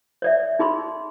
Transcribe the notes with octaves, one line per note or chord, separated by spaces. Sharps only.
C#5 D5 E5
D#4 G#4 B5 C6